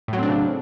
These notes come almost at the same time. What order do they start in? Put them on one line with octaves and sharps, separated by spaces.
A2 F#3 C4 D4 C#3